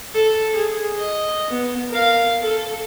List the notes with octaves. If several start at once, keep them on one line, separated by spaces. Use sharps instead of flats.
A4
G#4
D#5
B3
A#4 F5
A4